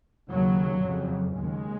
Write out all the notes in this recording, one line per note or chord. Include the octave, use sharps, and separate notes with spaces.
D#2 C#3 F#3
F2 C#3
D#2 C#3 G#3